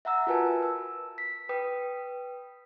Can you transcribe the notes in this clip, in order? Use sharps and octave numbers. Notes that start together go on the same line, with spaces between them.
E5 F#5 A#5 E6
F4 F#4 A#4 B4 G#5 A5
E6
B6
B4 G5 D#6